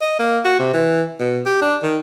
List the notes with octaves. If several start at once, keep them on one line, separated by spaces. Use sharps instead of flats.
D#5
A#3
F#4
C3
E3
B2
G4
D4
D#3